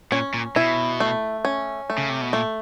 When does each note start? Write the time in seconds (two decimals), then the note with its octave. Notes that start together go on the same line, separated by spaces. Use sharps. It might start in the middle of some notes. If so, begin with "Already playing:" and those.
0.12 A#2 C#4
0.34 A#2
0.56 B2 E4
1.00 A3
1.45 C#4
1.90 A3
1.98 C#3
2.09 C3
2.21 B2
2.33 A#2 A3